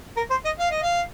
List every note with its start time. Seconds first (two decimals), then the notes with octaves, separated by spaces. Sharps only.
0.17 A#4
0.31 C5
0.45 D#5
0.59 F5
0.71 D#5
0.82 F5